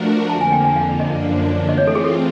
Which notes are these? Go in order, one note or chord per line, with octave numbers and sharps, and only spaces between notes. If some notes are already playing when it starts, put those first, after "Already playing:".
Already playing: F3 A3 D4 F#4 A#4
F2 D3 F3 A#3 A5
G#5
G5
G#5
F5
F#2 D3 F3 A#3 D4 D#5
E3 A3 C4 F4 D#5
C#5
A4
G#4
A4